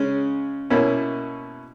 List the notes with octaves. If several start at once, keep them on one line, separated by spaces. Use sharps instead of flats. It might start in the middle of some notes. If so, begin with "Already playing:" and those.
Already playing: C#3 G#3 C#4
B2 A#3 C#4 E4